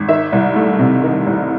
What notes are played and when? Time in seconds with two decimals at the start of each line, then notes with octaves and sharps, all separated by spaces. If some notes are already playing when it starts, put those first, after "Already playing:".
Already playing: G#1
0.09 D#3 E5
0.32 C2
0.56 A3
0.79 C3
1.03 D#3
1.27 C2